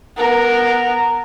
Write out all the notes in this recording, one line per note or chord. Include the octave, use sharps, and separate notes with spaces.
B3 A#4